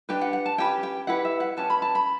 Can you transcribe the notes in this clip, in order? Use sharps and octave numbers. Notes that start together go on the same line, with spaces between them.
D4 G4 B4 G5
F#5
F#5
A5
C#4 G4 B4 G5
G5
E4 G4 B4 F#5
E5
F#5
C#4 G4 B4 A5
B5
A5
B5